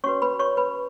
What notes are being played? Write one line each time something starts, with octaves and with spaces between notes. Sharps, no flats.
C#4 F#4 B4 C#5 C#6
B4 B5
C#5 C#6
B4 B5